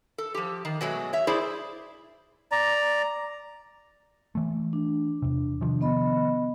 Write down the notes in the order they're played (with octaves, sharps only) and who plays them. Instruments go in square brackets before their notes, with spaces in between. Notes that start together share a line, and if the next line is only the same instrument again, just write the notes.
[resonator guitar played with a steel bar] A4
F3 G4
D#3
B2 F#3 G#3 A3
C#5 E5
E4 G#4 C5 D5
[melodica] D5 A#5
[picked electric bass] E3 A3
[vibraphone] D4
[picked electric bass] E2 C3
C3 D#3 F3
[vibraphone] B3 D#5 B5